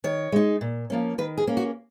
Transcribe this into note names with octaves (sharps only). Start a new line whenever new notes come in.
D#3 C#5
G#3 D#4
A#2
F3 A#3 C#4
D#3 B4
G#4
A#3 C#4
F#4